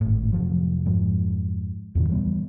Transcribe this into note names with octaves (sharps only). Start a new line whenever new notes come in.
G#1 A2
F1 F3 F#3
F2 G#2 F3
E2 G2 A#2 D#3
E3 G3 B3